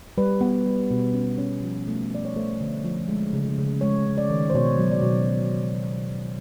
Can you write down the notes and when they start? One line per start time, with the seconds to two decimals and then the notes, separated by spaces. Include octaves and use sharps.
0.18 G3 B4
0.41 B3
0.66 G3
0.91 B2
1.14 C#4
1.38 C#4
1.64 F3
1.88 A3
2.11 F3 D5
2.25 C#5
2.36 A3 C5
2.61 D3
2.85 F3
3.08 G#3
3.33 C#3
3.58 C#3
3.81 G#3 C#5
4.06 C#4
4.18 D5
4.30 D#3
4.50 C5
4.55 B2 C#5
4.79 F#3
4.91 D5
5.03 B2